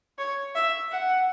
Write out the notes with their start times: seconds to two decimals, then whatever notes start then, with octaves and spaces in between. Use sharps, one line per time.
0.18 C#5
0.55 E5
0.92 F#5